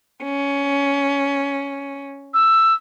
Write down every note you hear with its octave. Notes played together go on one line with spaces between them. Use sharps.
C#4
E6